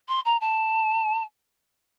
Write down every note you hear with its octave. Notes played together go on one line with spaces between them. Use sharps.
C6
A#5
A5